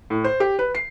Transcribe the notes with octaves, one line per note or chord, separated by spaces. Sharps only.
A2
C5
G4
B4
C7